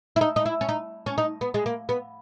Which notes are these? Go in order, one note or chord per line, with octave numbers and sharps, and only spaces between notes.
E4
D#4
D#4
E4
C#4
D#4
C#4
D#4
B3
G#3
A#3
B3